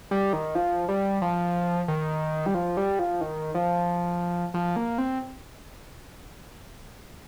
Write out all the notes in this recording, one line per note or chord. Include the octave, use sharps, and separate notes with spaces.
G3
D#3
F3
G3
F3
D#3
G3
F3
G3
F3
D#3
F3
F3
A#3
C4